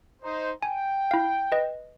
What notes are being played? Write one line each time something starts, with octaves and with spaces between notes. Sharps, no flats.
D#4 C5
G5 G#5
E4 F5
B4 D#5